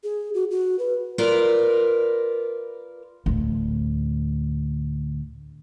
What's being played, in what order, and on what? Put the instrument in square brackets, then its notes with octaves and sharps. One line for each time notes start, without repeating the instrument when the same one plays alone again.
[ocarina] G#4
F#4
F#4
B4
[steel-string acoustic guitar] F4 A#4 B4 D5
[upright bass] D2 A2